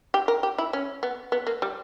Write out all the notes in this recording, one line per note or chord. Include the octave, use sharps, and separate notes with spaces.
G4
A#4
G4
E4
C#4
B3
B3
A#3
G3